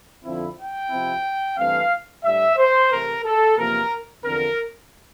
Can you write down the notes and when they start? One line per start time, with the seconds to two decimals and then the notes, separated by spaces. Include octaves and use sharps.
0.24 F2 D3 F3 C4 E4
0.57 G5
0.90 C3 F3 C4 E4
1.57 G2 E3 A3 C4 F5
2.24 A2 G3 D4 E5
2.57 C5
2.91 C3 E3 A3 A#4
3.24 A4
3.58 E2 C3 F3 A#3 A#4
4.24 E2 D3 F3 C4 A#4